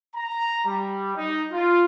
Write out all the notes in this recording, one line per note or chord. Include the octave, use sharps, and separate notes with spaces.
A#5
G3
D#4
F4